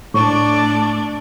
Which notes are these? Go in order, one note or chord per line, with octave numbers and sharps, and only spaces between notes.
A2 A3 D4 C#5 D5 C#6